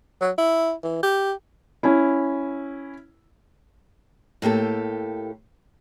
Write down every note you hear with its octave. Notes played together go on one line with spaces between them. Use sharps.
F#3
E4
E3
G4
C#4 E4
A2 A#3 G4 A4